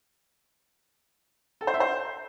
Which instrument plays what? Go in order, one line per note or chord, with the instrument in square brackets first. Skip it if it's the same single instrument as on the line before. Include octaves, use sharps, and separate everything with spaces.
[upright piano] A4
C5
E5
C5